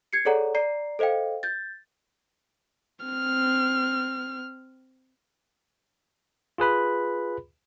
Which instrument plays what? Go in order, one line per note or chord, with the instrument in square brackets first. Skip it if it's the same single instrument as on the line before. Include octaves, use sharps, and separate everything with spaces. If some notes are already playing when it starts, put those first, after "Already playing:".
[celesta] G#6 C7 C#7
G#4 A4 C#5 D5 F#5 A#5
D5 A#5 C7
A4 C5 D#5 F5 G5
G6 A6
[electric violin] C4 F6
[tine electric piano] F4 G#4 B4 B5